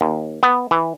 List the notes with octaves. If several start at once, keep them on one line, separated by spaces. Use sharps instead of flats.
D#2
B3
E3